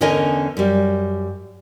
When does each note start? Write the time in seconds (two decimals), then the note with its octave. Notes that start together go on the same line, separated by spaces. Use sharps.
0.01 E2 D3 C#4 A#4 D#5 G#5
0.57 F#2 G3